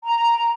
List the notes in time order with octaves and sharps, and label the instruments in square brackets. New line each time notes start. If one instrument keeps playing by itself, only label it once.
[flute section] A#5